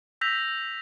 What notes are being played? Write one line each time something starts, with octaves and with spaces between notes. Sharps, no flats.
E6 G6 A#6 B6 F7